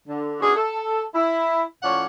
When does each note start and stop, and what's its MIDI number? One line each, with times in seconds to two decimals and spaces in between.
0.08 0.36 50
0.41 0.52 59
0.41 0.52 61
0.41 0.52 62
0.41 0.52 66
0.41 0.52 68
0.56 1.03 69
1.14 1.62 64
1.82 2.05 45
1.82 2.05 53
1.82 2.05 61
1.82 2.05 73
1.82 2.05 74
1.82 2.05 78